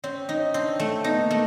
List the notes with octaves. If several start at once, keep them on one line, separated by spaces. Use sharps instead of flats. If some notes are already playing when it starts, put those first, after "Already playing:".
C4 C#4
D#4
C#4
C4 D4
A3
B3 D#4
A#3
A3